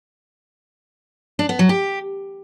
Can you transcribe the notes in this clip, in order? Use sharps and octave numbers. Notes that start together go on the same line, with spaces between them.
D4
B3
F#3
G4